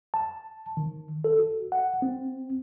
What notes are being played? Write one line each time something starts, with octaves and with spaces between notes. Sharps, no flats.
A5
D#3
A4
F#4
F#5
C4